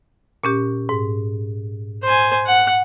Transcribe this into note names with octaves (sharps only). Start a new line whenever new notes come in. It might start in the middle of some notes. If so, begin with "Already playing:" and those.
A#2 C#4 G4
G#2
C5 G#5
F#5